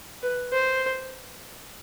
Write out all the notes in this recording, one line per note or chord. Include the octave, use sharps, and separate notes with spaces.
B4
C5